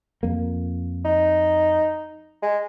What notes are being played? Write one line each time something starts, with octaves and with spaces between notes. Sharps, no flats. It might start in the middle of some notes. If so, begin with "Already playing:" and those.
F2 A#3
D#4
G#3